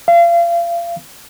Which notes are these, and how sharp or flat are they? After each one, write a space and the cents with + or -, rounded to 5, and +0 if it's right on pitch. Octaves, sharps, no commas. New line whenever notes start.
F5 -35